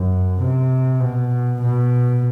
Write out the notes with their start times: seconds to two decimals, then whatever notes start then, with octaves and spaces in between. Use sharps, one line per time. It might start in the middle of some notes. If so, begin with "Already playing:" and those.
Already playing: F#2
0.41 C3
1.00 B2
1.61 B2